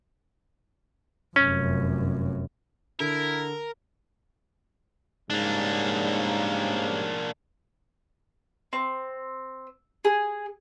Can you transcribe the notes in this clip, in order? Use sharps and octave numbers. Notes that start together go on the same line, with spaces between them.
F1 F#2 C#4
D3 E4 A#4
G#2 C#3 G3 A#3 D4
C4
G#4